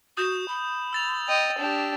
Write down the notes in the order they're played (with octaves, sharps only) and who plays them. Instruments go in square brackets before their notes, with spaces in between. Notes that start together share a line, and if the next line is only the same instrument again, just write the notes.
[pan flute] F#4 [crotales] D#6 G6 E7
[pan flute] B5
[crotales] E6 A6 F7
[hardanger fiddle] D#5 G5
D4 G4